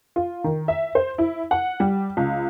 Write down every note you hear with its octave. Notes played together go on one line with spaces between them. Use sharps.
F4
D#3
E5
C5
E4
F#5
G3
C#2